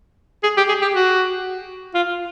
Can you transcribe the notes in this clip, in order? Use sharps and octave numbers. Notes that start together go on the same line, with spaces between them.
G#4
G4
G#4
G4
F#4
F4